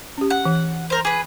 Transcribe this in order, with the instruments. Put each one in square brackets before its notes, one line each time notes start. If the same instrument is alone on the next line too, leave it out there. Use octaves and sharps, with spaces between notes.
[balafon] C#4 G4
[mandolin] F#5
[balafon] E3
[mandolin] A#4 C5
[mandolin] G#4 B4 [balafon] D6